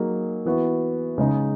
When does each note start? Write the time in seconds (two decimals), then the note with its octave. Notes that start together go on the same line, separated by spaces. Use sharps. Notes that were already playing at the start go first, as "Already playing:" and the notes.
Already playing: F#3 A#3 D#4 G#4
0.45 E3 B3 F#4
1.18 C#3 G#3 D#4